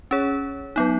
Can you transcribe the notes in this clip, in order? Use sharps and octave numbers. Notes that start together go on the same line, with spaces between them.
C#4 G#4 C#5
F#3 B3 D#4